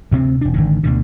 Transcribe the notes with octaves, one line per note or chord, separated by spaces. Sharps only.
D2 C3 A3 C4
E1 D4
G#1 D3 D#3
D2 B2 D3